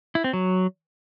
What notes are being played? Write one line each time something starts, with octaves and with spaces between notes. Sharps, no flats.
E4
C4
F#3